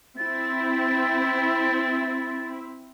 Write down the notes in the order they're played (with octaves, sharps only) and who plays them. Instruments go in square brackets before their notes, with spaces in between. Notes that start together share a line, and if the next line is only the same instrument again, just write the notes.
[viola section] C4 E4 [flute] A6